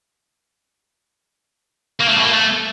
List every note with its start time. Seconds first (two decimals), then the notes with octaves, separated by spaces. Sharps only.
2.00 A#3
2.09 A3
2.17 B2
2.25 A#3
2.33 A3